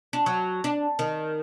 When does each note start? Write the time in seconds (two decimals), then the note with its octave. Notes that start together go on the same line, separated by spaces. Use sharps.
0.13 D4
0.26 F#3
0.64 D4
0.99 D#3